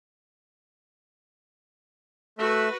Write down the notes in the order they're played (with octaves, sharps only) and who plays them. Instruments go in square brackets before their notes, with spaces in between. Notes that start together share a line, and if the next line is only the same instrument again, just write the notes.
[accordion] A3 E5 [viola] F#4 B4